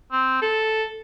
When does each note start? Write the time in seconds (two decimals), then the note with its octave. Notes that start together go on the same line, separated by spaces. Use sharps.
0.12 C4
0.42 A4